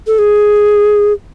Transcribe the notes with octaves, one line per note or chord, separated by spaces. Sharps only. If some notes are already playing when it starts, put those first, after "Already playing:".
A4
G#4